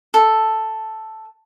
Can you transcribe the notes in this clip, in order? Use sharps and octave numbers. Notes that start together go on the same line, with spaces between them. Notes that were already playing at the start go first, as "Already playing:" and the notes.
A4